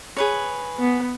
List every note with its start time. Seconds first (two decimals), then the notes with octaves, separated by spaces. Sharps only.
0.17 G#4 B4 C#5
0.79 B3